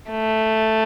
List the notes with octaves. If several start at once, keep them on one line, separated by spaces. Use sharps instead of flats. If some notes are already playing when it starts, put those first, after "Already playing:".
A3